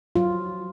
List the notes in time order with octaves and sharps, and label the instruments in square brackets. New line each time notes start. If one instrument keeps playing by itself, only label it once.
[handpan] F#3 F4